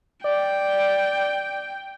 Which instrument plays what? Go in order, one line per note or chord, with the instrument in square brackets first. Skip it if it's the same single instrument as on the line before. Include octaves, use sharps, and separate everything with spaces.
[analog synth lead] D5 [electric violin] G5